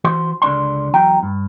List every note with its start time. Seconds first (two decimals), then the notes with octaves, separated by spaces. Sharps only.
0.04 E3 F#4 C5 C6
0.42 C#2 D3 D4 D5 C6
0.94 E2 F#3 G5 A#5
1.23 G2